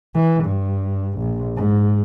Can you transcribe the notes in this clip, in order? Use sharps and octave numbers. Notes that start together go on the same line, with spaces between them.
E3
G2
A#1
G#2